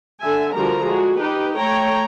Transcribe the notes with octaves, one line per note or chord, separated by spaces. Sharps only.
D3 E5 G#5
D3 F3 G3 F#4 A#4 A#5
G#3 F#4 G#4
D#4 G4 B4
A3 C#5 G5 A#5